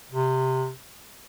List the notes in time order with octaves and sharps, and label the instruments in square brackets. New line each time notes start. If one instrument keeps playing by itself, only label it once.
[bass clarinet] C3